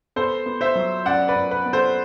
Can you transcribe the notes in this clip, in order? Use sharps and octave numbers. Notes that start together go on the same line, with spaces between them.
B3 A4 C5
B3
C5 E5
F#3
F#2 D5 F#5
B4 D5
F#2
B4
B3
A4 C5